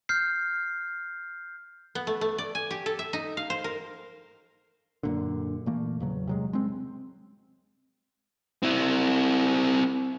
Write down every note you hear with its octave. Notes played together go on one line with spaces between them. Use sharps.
F6 G6 C7
B3
A3
A3
D5
G#5
G4
A4
E5
D#4
F5
C5
A#4
F#2 A#2 D3
A#2 E3 A3 A#3
E2 C#3 F#3
C3 F#3 G#3
G#3 C4
C4 E4